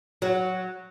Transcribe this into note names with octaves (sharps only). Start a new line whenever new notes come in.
F#3